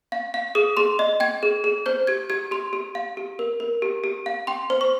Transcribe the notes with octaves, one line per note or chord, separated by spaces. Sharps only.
F5
F5
G#4 D#6
G#4 C6
D#5
G5 G#6
G#4
G#4
C5 G6
G4 G#6
G4 G#6
G4 C6
G4
F5
G4
A#4
A#4
G4
G4
F5
G5 C6
C5
C#6